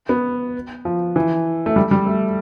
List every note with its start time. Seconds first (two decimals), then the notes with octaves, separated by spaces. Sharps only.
0.09 B3
0.85 F3
1.16 E3
1.66 A3
1.76 G3
1.91 G3
2.06 A3